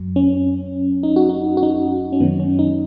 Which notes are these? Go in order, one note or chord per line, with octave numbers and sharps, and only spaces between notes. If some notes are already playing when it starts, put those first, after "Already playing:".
Already playing: F#2 F#3
C#4
D#4
F#4
D#4
F#4
D#4
C#4
F#2 D#3 F#3 B3
C#4
D#4